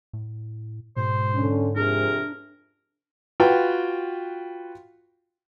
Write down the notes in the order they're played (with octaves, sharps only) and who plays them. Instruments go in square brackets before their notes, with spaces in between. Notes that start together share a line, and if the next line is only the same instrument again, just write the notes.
[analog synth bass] A2
[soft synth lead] G#2 [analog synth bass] B2 [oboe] C5
[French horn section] D3 C#4
[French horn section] F2 C3 G#4 [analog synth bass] D4 [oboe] A#4
[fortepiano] F4 F#4 B4 G5